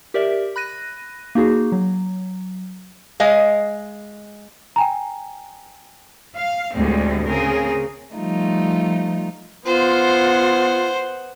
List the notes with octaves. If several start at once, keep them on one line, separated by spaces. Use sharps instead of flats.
G4 A#4 D5 E5
B5 F#6 A#6 D#7
A#3 D#4 F#4 G#4
F#3
G#3 D#5 F5
G5 G#5 A#5
F5
D2 A2 D3 G3 G#3 C4
C#3 C4 G#4 A#4
F3 G3 A3 D#4 F4
B3 F4 C5 F#5